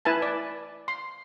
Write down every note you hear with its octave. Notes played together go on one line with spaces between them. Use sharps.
E4 B4 G#5 A5
D5
C6